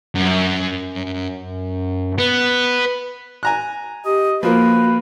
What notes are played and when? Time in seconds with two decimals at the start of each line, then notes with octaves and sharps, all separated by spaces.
0.16 F#2
2.19 B3
3.43 G#5 A#5 F#6
4.05 G4 D#5
4.43 F3 A#3 F#4 A#4 B4